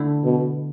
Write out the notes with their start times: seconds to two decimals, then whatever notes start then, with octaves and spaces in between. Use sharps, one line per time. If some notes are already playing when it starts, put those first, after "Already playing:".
Already playing: D3 A3 E4
0.25 B2